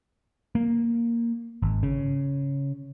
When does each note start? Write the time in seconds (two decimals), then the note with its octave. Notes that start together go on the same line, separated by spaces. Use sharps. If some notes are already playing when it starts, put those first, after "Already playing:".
0.55 A#3
1.62 G#1
1.83 C#3